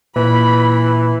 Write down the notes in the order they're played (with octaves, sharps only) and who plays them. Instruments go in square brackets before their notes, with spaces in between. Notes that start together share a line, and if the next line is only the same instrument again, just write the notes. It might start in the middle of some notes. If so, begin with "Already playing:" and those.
[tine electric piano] A#2 [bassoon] E3 [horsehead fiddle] B5